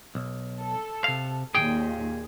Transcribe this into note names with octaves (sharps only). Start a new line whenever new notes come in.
B1
A4
C3 F5
D#2 A#2 G#4 G5